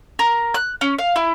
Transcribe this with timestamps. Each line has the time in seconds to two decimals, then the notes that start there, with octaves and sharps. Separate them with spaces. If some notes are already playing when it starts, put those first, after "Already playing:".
0.19 A#4
0.54 F#6
0.81 C#4
0.98 F5
1.16 E4